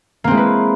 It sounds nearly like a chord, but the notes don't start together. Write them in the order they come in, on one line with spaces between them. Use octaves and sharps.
A#3 C4 G#3 E4 B4